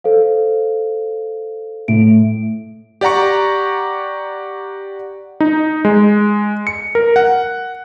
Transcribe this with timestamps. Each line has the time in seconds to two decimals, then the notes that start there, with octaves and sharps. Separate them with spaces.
0.04 A4 C5 F5
1.88 A2 D7
3.01 G4 D5 F#5 A#5 C#6
5.40 D#4
5.85 G#3
6.67 C#7
6.95 A#4
7.16 F#5